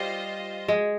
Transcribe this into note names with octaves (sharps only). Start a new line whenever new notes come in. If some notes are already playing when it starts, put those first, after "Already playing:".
Already playing: G3 F4 C5 D#5
G#3